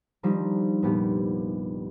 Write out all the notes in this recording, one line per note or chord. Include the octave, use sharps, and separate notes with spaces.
D#3 F3 G3 D4 D#4
F1 A#2 B3 G4